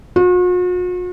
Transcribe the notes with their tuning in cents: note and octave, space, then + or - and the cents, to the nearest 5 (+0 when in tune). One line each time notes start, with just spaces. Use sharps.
F#4 -45